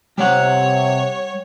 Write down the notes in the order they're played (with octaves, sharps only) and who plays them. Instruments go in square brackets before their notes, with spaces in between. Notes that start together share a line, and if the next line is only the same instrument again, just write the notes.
[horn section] C3 [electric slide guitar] G3 F#5 [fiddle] C#5